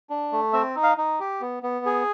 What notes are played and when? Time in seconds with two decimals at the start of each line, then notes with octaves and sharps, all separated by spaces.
0.10 D4
0.32 A3
0.53 C4 E5
0.76 D#4
0.83 F5
0.97 D#4
1.20 G4
1.41 B3
1.63 B3
1.86 G#4